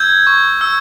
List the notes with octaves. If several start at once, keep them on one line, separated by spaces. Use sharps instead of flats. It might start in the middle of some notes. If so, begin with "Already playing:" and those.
Already playing: E6 G6 G#6
C#6
E6